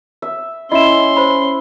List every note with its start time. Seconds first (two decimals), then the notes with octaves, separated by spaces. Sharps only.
0.22 E5
0.72 C#4 E4 D#5 E5 C6 E7
1.17 C5 B5